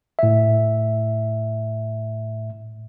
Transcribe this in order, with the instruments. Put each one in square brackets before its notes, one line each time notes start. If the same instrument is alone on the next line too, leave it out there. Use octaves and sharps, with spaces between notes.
[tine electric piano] A2 E5